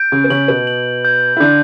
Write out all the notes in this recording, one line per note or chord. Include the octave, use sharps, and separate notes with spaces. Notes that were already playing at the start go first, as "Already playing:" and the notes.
Already playing: G6 D7
C#3 C#4
B3
C#3 C#4 F#7
B2 B3
F#7
G6
E4
D3 D4 G6